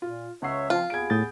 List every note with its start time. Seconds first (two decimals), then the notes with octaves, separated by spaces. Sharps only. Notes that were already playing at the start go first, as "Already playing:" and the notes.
0.02 A#2 F4
0.42 C#2 C#5 E5 F#5 C7
0.70 F3 C4 F4
0.90 D#2 B3 G#4 G#6 D7
1.10 A2 D#6 G6 A6